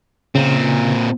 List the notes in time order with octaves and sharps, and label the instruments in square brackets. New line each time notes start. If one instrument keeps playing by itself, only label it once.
[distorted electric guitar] A#2 C4 [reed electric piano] C#3